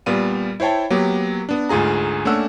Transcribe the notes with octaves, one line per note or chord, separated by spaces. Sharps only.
A#2 G3 B3 F5 D#7
E4 C5 C#5 G5 A5
F#3 A#3 B3 G4
B3 D4
D2 G#2 F4 G#4 A#5
A3 A#3 C#4 D4 F#5 E6